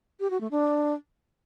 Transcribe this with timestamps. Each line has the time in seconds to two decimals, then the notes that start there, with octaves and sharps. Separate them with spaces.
0.20 G4
0.30 F#4
0.41 A3
0.51 D4